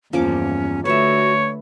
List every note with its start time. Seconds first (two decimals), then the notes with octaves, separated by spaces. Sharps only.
0.13 E2 G2 F3 A#3 C#4 D6
0.85 D3 A3 F#4 B4 C#5 E5